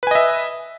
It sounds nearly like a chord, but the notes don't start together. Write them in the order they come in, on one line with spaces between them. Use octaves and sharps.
B4 G#5 D#5 E5